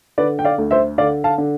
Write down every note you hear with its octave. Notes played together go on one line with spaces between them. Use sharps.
D3 B4 D5
G5
D5 F5
D2
C5 E5
D3 D5 F5
F5 A5
D3